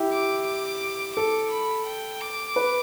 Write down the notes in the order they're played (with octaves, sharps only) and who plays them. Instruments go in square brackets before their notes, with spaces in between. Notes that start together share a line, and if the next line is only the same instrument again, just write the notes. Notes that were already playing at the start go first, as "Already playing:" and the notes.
Already playing: [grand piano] E4 G4
[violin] D6
D6
[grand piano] A4 [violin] D6
[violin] B5
G5
D6
[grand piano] B4